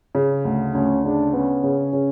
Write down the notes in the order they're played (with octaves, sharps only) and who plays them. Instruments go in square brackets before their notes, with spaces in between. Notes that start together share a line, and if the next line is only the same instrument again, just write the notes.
[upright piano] C#3
D2
[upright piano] D2 [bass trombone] C#4
[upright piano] C#3 [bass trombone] D4
[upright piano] B3 [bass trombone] C#4
[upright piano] C#3
C#3